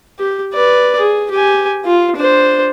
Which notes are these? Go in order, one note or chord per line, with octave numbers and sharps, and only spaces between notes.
G4
B4 D5
G#4
G4 G#5
F4
D4 C5